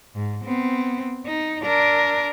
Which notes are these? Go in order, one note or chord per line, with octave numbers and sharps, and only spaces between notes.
G#2
B3 C4
D#4
D4 A#4